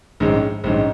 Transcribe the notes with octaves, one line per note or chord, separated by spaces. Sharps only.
A#1 G#2 D#3 G#3 C#4
A#1 G#2 D#3 G#3 C#4